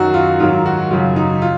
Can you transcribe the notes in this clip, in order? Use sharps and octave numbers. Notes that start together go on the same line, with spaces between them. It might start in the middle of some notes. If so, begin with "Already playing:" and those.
Already playing: F#2 D#3 F#3 F#4
F4
G#2 D#3 F#3 F4
F#4
F#2 C#3 F#3 F4
D#4
F4